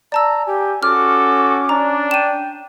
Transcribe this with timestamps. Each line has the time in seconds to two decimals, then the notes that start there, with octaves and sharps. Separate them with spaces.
0.12 D5 A5 A#5 E6
0.47 G4 G#5
0.83 C#4 F#4 A4 D6 F6
1.69 D4 A#5
2.11 G5 D#7 E7